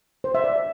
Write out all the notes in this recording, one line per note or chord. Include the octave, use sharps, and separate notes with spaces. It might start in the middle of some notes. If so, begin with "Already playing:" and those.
C5
E5
D5